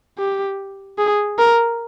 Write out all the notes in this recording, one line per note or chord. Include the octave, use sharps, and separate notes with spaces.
G4
G#4
A#4